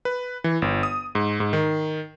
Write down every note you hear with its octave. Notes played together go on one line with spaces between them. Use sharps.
B4
E3
G1
D#6
G#2
G#2
D#3